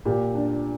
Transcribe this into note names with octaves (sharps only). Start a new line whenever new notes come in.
A#2 G4
D4